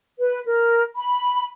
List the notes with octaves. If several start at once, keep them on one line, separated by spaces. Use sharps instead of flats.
B4
A#4
B5